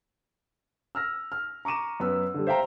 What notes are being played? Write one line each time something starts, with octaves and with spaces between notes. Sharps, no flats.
E6 F6 A#6
F6
A#5 C#6 D6 D#7 E7
F#2 B3 B4 E6
D3 G3
C5 E5 F5 G5 A#5